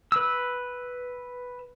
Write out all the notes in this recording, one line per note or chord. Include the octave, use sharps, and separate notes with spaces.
B4 E6